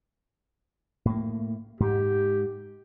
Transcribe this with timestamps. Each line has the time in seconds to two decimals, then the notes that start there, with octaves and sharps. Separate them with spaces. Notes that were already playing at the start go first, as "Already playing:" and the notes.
1.05 A2 A#3
1.80 G#2 G4